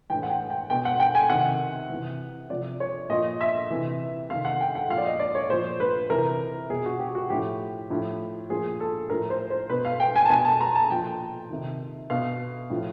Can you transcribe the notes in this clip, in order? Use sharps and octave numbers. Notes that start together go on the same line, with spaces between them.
A2 E3 G5
F#5
G5
G5
B2 G5
F#5
G5
G#5
C3 D#3 F#5
C3 E3
C3 F3 D5
C#5
A#2 F3 D#5
E5
C3 E3
C3 D#3 F5
F#5
G5
F#5
A#2 F3 F5
D5
D#5
D5
C#5
A#2 F3 C5
B4
C3 E3 A#4
B2 G#4
F#4
G4
F#4
A2 F3 G4
A2 F3
A#2 F3 G#4
A4
A2 F3 A#4
C5
C5
B2 B4
F5
G5
G#5
A5
B2 G#5
A5
A#5
A5
A#2 F3 G5
C3 D#3
B2 F5
A2 F3